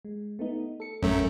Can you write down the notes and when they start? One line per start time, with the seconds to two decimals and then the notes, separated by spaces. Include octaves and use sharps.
0.05 G#3
0.39 A3 B3 D#4
0.80 A4 C#7
1.02 A1 F#2 A3 C#4 A#5